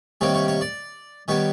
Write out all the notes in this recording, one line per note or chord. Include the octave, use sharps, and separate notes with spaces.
C3 D#3 G3 A#3 C#5
C#5
C#5
D5
D#3 G3 B3 C#5